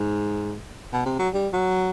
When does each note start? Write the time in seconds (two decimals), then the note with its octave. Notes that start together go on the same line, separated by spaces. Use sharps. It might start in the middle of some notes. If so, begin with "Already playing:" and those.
Already playing: G#2
0.93 B2
1.06 C3
1.19 F#3
1.34 G3
1.53 F#3